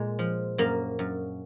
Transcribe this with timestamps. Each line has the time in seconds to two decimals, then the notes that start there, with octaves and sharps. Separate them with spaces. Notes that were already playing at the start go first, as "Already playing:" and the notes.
Already playing: A#2 G#3
0.19 F3
0.58 F#2 A#3
0.99 F#2